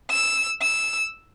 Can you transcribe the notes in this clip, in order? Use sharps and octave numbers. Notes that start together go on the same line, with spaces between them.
E6
E6